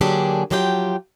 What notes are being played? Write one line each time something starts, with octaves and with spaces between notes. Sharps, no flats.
D3 F#3 A#3 D4 G4 G#4
F3 F#3 F4 G4 D#5 G5